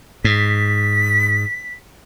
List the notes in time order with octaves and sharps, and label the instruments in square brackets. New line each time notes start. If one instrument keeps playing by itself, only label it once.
[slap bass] G#2 [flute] B6